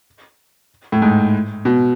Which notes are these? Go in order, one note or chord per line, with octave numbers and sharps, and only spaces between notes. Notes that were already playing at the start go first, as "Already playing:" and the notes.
A2
G#2
B2